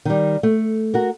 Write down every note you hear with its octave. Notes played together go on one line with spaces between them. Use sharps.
D#3 G3
A3
F#4 A#4